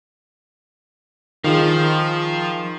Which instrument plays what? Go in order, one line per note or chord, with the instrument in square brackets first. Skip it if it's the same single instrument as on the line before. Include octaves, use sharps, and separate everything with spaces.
[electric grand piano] D#3 F4 G#4 [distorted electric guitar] F3